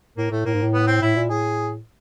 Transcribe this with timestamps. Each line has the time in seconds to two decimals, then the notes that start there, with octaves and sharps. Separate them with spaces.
0.17 A2 A#3
0.31 A2 A3
0.45 A2 A#3
0.54 G#2
0.62 A2
0.73 B3
0.87 C4
1.01 A2 E4
1.16 A#2
1.30 A2 G#4